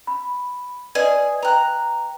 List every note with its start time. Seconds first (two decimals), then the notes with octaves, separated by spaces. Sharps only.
0.07 B5
0.95 G#4 B4 D5 D#5
1.43 B4 D#5 G5 A#5 F#6